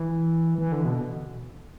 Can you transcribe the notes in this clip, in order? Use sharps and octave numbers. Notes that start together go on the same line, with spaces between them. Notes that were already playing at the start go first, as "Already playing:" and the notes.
Already playing: E3
E3
D3
B2